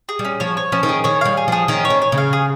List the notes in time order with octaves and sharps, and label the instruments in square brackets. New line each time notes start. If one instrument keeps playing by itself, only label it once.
[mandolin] G#4
[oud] G3
[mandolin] C#4
[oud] F3 [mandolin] C#5
[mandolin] C#5
[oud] F3 [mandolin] C#4
[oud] D#3
[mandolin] G#4
[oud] D#3 [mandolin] C#5
[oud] G3 [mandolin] F5
[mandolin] G#4
[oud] F3 [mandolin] G#4
[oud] D#3 [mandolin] C#4
[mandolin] C#5
[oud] D#3
[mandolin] C#5
[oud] C#3
[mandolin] F5
G#4